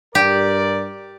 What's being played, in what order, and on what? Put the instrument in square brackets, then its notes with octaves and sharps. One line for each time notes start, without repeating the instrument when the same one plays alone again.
[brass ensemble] G2 A#4 D5 [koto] G4